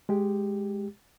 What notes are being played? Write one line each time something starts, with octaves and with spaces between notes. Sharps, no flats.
G#3 G4